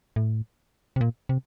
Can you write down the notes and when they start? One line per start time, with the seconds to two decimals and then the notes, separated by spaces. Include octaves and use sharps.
0.16 A2
0.96 C3
1.01 A#2
1.29 C3